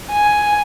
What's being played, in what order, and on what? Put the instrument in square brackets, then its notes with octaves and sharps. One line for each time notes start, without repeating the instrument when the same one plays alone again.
[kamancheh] G#5